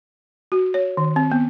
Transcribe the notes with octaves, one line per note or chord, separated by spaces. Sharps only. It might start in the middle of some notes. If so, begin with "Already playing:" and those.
F#4
C#5
D#3
C4
B3